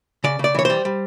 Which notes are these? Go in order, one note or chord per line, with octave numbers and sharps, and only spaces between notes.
C#3 D5
C#3 D5
E3 C#5
G3 C5
G3